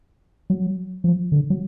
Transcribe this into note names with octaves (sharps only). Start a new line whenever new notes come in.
F#3
F3
D3
F#3